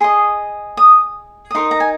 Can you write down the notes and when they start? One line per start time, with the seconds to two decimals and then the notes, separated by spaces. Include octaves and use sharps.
0.01 G#4 D#5 C6
0.77 D#6
1.51 D#6
1.55 D#4 A#4 D#5 C6
1.71 A#5
1.80 G#5